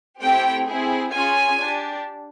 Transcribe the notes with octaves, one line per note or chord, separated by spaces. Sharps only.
A3 C4 E4 G4 G5
C4 E4 G#4
C#4 F4 G#4 G#5
D4 G4